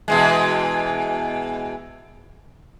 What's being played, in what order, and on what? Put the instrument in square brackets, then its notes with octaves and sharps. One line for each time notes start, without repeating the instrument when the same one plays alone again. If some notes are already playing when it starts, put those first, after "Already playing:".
[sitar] B2 E3 G#3